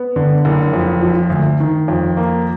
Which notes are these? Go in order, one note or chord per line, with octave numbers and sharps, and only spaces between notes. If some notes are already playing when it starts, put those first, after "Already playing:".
Already playing: B3
D3
F#1
F2
F3
D2
D#3
F2
A#3